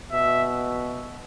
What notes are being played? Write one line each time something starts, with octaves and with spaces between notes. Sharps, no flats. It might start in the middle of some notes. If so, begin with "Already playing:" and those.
B2 E5